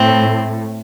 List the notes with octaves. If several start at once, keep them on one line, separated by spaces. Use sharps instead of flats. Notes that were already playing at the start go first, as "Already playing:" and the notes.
Already playing: A2 C4